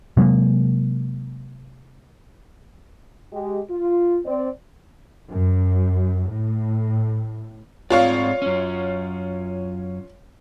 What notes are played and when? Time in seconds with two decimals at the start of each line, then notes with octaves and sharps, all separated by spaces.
0.17 C3 F#3 G#3 A#3
3.33 G#3 G4
3.71 F4
4.26 C4 D5
5.32 F#2
6.31 A2
7.90 G#2 C4 F4 C#5 D5 F5
8.42 F#2 C#4